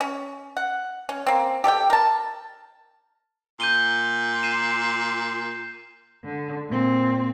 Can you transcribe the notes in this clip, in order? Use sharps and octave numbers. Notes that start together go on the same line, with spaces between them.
C#4
F#5
C#4
A#3 C4
G4 A4 C#5 G5
A#4 A5
A#2 G6 D#7 G7
C7 D#7 E7
D3
A#2 C4